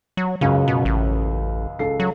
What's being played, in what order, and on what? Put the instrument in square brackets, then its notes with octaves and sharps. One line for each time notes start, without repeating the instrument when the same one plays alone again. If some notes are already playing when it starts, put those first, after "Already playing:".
[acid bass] F#3
[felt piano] C#2 F#2 [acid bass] C#3
[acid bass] B2
A1
[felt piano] C#2 A4 C7
[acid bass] F#3